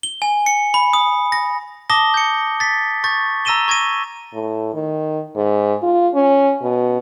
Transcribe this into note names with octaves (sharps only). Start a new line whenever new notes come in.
G7
G#5
C#7
B5
D#6
A#6
A5 D6 D#6 A#6 G7
G6 C#7
A6 B6
C#6 G6 A6
A#5 E6 A#6 D#7 E7 G7
C#6 G#6 A#6 D#7
A2
D#3
G#2
F4
C#4
B2